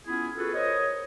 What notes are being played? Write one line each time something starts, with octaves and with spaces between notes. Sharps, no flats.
B3 C#4 E4 F4 G#4
F4 F#4 G#4 A4 B4
A#4 C5 C#5 D#5